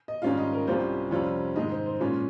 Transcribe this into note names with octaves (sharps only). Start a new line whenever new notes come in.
D#5
G#2 D#3 G3 C#4 F4 F5
D#5
A#4
C2 C3 G3 C#4 F4 C5
F2 C3 G3 C#4 F4 C#5
G#2 D#3 G#3 D#5
C5
C5
A#2 G#3 C#4 F4